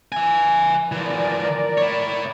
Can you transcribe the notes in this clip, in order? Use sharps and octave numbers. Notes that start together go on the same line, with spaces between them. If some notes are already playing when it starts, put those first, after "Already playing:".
E5 G#5
E3 F3 A#4 D5
E4 C#5